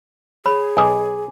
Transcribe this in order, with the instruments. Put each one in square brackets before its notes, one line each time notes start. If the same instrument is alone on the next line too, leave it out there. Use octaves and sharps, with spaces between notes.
[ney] G#4 [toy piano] C#5 B5
[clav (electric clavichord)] B1 D#5 [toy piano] G#5 D6